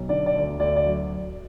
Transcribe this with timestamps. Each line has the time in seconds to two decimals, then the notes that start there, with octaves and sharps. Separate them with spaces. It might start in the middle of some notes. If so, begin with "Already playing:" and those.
Already playing: B1
0.09 D3 D5
0.26 D5
0.35 D2
0.59 D2 D5
0.76 D5
0.85 F#3